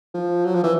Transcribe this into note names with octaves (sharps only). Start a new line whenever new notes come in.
F3
F#3
F3
E3